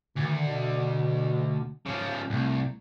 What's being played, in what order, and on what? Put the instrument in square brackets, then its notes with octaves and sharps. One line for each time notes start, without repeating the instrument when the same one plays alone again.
[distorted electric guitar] D2 [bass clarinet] D#3
[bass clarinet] B2
[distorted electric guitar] C#3 F3
[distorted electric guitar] C2 [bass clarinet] A3